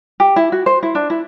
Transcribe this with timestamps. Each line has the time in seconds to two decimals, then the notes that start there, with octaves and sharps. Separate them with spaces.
0.20 G4
0.36 E4
0.52 F#4
0.66 C5
0.83 E4
0.95 D4
1.10 E4